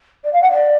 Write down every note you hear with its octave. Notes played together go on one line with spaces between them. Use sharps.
D5
F5
F#5
D5